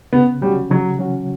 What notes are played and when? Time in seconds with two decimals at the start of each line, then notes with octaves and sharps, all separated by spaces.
0.13 C#3 B3
0.41 F#3 G3 C#4 F#4
0.71 C#3 F#3
0.99 F#3 C#4 F#4